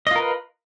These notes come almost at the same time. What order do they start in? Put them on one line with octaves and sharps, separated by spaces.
D#5 F4 A#4 B4